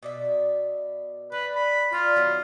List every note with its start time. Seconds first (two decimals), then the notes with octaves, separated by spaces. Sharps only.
0.03 B2 D5 E5
1.32 B4 D5
1.55 B5
1.93 F4 D5 F#5 A#5
2.16 D#3 F#3 B3